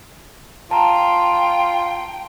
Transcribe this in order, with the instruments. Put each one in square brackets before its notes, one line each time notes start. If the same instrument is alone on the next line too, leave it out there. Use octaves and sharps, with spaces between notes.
[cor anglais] F4 [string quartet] G5 [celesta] A5 A#5